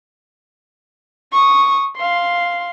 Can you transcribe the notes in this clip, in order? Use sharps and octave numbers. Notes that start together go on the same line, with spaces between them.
C#6 D#6
F5 C6